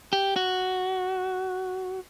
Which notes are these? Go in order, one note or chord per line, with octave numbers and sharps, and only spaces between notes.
G4
F#4